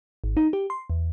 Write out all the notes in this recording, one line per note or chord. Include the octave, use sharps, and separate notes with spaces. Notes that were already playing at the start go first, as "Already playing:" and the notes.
G#1
D#4
G4
C6
E2